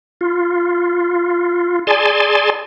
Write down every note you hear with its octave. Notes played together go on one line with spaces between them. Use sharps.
F4
G#4 D5 G#5 A5 C6